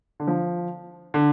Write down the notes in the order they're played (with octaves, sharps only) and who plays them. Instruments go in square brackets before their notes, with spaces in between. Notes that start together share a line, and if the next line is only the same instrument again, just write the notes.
[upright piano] D3
F3
D3